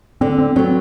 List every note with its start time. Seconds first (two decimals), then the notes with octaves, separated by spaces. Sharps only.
0.21 D3 C4
0.38 C4
0.56 F#3 B3 C4